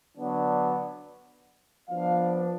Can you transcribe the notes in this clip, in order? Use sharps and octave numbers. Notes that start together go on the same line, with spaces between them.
D3 F#3 B3 D4
F3 B3 D4 F5